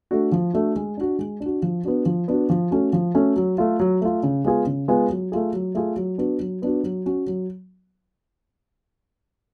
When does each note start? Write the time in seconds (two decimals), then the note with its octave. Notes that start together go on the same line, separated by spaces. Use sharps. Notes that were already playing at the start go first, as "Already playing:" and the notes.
0.11 A3 D4 F#4
0.32 F3
0.54 A3 D4 F#4
0.76 G#3
0.97 D4 F#4
1.19 G#3
1.40 D4
1.46 F#4
1.63 F3
1.85 B3 D4 F#4
2.06 F3
2.28 B3 D4 F#4
2.50 F3
2.71 A3 C#4 F#4
2.93 F3
3.15 A3 C#4 F#4
3.36 F#3
3.58 A3 F4
3.80 F#3
4.01 A3 F4
4.23 C#3
4.44 G#3 B3 F4 G#4
4.66 C#3
4.88 G#3 B3 F4 G#4
5.10 F#3
5.32 A3 F4 G#4
5.53 F#3
5.75 A3 F4 G#4
5.96 F#3
6.18 B3 D4 F#4
6.40 F#3
6.62 B3 D4 F#4
6.83 F#3
7.06 C#4 F#4
7.27 F#3